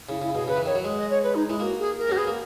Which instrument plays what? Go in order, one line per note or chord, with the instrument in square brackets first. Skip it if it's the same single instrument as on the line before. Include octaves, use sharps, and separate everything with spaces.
[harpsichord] C#3 [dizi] E4
[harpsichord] C#3 [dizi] E4
[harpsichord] B2 [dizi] G#4
[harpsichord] C#3 [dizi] B4
[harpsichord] E3
[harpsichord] D#3 [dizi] C#5
[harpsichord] F#3
G#3
[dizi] D#5
C#5
B4
D#4
[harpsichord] G#3 [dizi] E4
[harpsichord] A#3 [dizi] F#4
[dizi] G#4
A#4
[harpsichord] C#4 [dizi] F#4
[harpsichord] B3 [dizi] G#4
[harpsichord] A#3